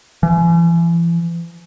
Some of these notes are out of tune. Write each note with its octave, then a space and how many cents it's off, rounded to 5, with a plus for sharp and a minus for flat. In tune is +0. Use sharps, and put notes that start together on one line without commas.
E3 +40